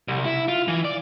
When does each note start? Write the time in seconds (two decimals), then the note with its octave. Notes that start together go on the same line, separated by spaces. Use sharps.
0.08 C2
0.25 E4
0.48 F4
0.68 E3
0.84 D5